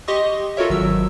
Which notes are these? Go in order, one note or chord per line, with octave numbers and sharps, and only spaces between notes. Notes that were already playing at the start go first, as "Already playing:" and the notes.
G4 D#5 C6 C#6 D#6
F4 F#4 A4 A#4 C#5 E5
G#1 F#3 E6